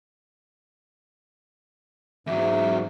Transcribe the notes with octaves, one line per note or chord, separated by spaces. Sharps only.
E2 G#2 F#3 E5